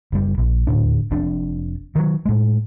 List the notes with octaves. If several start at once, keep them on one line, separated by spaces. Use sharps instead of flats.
F#1 G3
A#1
D#1 D2 A2 D4
F1 F2 D4
D#3 F#3
A2 G#3